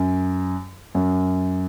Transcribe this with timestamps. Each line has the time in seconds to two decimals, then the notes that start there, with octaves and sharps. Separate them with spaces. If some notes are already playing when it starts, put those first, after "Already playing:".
Already playing: F#2
0.95 F#2